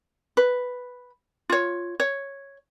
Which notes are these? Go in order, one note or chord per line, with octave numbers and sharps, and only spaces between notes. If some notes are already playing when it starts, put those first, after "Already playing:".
B4
F4 C#5
C#5